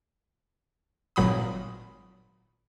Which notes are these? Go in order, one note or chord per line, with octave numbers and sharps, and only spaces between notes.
G#1 A#2 F#3 B5 D#6